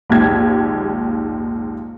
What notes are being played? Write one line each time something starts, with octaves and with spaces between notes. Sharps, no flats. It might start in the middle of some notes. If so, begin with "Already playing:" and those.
A#1 D#2 G#2 G4 G#6